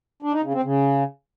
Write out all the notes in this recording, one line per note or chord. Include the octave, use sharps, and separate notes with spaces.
D4
D#4
C#3
C4
C#3